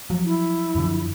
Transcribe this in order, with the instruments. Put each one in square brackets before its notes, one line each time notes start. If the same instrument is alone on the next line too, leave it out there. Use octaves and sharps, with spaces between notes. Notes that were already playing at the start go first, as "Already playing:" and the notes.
[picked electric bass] F3 F#3
[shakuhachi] E4
[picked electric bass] F#2 D3 F3